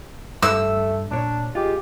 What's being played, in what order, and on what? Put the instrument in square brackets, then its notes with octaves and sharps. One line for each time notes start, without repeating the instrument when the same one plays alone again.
[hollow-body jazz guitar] G2 [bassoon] A3 [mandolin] E6
[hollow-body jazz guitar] A#2 C#5 [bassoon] D4
[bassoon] G#3 [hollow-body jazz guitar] F4 [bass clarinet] G4